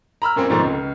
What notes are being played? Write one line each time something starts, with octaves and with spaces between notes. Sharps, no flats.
A#5 B5 E6 F6
F#2 A#2 A#3 C4
G#2 B2 D3 F3 A3 C4
C#2